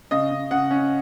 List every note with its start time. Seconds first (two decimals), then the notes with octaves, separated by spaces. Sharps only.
0.11 C#3 D#5
0.31 C#3
0.51 C#3 F#5
0.71 C#4